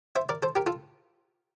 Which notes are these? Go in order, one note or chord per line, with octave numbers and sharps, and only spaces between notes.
C5 E5
A#4 D5
A4 C5
G4 A#4
F4 A4